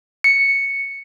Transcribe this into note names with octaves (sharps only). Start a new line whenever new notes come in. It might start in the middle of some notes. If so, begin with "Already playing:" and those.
C#7